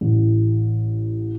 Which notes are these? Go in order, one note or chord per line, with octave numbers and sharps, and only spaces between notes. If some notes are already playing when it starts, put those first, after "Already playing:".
A1